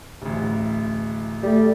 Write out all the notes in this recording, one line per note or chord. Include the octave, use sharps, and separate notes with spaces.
D1 A1
G3 A3